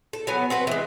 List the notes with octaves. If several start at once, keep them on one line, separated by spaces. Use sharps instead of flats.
A4
F#3 B3 G#5
C4 F#4 B4
E3 G#3